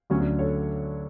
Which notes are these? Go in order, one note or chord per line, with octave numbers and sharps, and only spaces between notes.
D2 D3 F#3 C#4
D4
A4 C#5